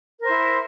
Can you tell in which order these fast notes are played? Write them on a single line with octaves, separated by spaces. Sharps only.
A#4 C5 E4